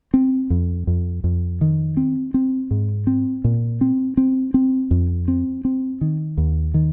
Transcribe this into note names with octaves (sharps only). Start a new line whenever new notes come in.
C4
F2
F2
F2
D#3
C4
C4
G#2
C4
A#2
C4
C4
C4
F2
C4
C4
D#3
D#2
D#3